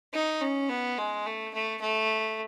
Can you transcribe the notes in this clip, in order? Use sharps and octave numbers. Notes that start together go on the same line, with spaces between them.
D#4
C#4
B3
G#3
A3
A3
A3